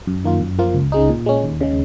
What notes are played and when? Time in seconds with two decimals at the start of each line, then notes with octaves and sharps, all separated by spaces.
0.07 F#2
0.24 D#3 A#3 F4
0.41 F#2
0.59 F3 A#3 F4
0.74 C#2
0.92 C#3 G#3 D#4
1.09 A#2
1.26 G#3 C#4
1.44 D#2
1.61 C#3 G#3